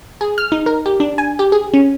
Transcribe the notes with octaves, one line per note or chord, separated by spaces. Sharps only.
G#4
F6
D#4
A#4
G4
D4
G#5
G4
G#4
C#4